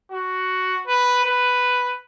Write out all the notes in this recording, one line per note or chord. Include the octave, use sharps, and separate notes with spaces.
F#4
B4
B4